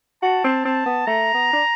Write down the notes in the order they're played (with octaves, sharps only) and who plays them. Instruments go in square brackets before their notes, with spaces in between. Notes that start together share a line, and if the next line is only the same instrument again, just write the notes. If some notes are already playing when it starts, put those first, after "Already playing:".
[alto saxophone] F#4 [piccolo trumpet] A5
[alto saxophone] C4
[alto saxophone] C4 [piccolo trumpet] A5
[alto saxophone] B3
[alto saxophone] A3 [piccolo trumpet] A#5
[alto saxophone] B3
D4